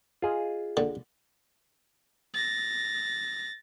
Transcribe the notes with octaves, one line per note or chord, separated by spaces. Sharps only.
F4 G#4 D#5
D3
A6 A#6